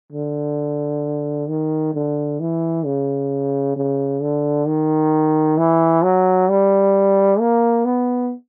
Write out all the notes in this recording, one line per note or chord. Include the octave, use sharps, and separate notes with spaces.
D3
D#3
D3
E3
C#3
C#3
D3
D#3
E3
F#3
G3
A#3
B3